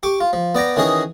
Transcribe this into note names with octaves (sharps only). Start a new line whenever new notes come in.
G4 C#6 D6
F4
F3
B3 D5 G5 A#5
D#3 E3 C#4 G#4 D#5